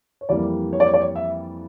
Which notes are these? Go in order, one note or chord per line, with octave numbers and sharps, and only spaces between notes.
C#5
F2 E3 G3 A#3 D5
C#5
D5
C#5
D5
C#5
E5